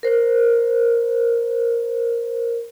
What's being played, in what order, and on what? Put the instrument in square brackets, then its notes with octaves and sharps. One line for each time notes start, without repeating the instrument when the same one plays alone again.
[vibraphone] A#4 C5